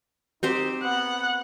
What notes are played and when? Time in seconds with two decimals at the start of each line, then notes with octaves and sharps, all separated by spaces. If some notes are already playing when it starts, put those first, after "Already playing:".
0.43 C4 D#4 G4 C5
0.83 B3 F#5